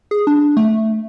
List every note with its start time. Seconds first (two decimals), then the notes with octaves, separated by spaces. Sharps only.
0.11 G#4
0.27 D4
0.57 A3